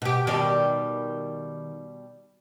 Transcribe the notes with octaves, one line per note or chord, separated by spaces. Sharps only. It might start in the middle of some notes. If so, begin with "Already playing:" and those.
B2 G4
B2 D#3 G3 G4 D5